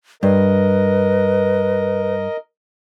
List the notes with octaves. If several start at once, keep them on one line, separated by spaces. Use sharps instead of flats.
G2 A#4 B4 D#5